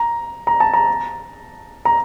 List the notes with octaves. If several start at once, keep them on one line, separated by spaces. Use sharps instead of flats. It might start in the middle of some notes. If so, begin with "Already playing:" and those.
Already playing: A#5
A#5
A5
A#5
A#5